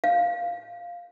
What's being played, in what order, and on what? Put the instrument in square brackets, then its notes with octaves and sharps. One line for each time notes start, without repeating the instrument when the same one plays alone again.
[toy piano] F5